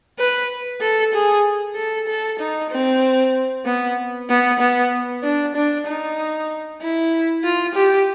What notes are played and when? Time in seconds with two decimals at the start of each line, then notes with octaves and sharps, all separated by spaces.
0.19 B4
0.81 A4
1.14 G#4
1.75 A4
2.08 A4
2.40 D#4
2.70 C4
3.65 B3
4.29 B3
4.59 B3
5.23 D4
5.55 D4
5.86 D#4
6.81 E4
7.44 F4
7.75 G4